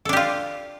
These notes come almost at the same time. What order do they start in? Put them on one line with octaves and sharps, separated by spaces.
A4 D4 G4 F4